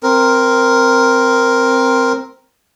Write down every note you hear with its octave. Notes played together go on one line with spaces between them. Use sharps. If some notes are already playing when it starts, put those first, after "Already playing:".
C4 A#4